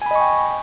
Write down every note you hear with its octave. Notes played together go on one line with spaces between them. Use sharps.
D#5 G5 G#5 B5 C#6